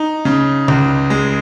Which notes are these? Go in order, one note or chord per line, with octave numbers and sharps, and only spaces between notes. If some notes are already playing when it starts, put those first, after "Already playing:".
Already playing: D#4
C#3
C#2
G#3